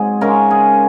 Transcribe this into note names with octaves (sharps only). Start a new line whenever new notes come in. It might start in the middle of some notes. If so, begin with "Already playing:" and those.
Already playing: G#2 F#3 C4 G#4
C#3 G#3 C#4 A#4
G#4